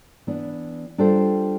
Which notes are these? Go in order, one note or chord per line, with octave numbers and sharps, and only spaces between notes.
E3 B3 D4
G3 D4 F4 A4 C5